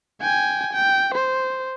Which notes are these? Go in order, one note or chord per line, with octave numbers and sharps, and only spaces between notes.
G5 G#5
G5
C5